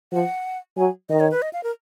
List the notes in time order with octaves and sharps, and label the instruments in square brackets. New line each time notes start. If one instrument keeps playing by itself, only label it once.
[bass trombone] F3 [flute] F#5
[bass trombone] F#3 [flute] G#5
[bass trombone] D#3 [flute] D#5
[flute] C#5
B4
D#5
F5
A#4